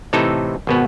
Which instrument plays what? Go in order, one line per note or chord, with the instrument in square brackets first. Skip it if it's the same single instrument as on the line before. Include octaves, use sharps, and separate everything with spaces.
[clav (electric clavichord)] A2 C3 E3 D#4 A4
G#1 B2 B3